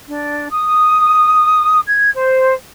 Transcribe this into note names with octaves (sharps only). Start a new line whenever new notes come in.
D4
D#6
G#6
C5